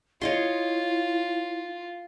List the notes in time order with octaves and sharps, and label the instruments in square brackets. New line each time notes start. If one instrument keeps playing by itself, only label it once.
[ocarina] E4 [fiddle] F4 [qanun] C#5 D#5 C6